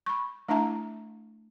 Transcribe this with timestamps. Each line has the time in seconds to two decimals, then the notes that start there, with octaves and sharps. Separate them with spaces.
0.06 B5 C#6
0.49 A3 D4 E4 E5 A5 A#5